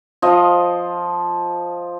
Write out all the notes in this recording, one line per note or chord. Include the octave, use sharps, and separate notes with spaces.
F3 D#5